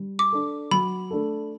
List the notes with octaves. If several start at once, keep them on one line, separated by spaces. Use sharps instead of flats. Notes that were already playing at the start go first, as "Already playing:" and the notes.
Already playing: G3
D6
D4 A4
F#3 B5
A3 D4 A4